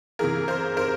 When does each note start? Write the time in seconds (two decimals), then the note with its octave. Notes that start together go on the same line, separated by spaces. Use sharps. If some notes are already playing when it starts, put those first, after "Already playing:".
0.19 C3 E3 G#4 A#4
0.48 A#4 C5
0.77 A#4 C5